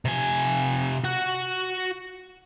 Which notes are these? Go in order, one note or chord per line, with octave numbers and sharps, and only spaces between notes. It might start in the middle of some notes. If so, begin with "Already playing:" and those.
C3 G#5
F#4 F#5